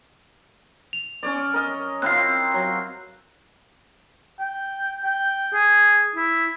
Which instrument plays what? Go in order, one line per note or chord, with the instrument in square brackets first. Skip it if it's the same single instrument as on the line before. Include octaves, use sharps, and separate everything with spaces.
[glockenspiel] F7
[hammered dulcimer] C#4 C#5 D5
A#4 D#5
[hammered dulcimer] C4 E4 F4 [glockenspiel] F#6 C7
[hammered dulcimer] F#3
[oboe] G5
G5
G#4
E4